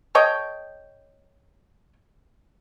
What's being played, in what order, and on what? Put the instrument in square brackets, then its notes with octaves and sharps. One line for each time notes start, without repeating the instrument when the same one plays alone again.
[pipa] A4 C#5 D#5 G5